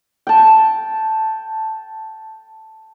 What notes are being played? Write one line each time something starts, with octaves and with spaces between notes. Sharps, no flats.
G5 A5